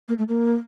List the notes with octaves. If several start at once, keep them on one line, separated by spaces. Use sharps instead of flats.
A#3
A3
A#3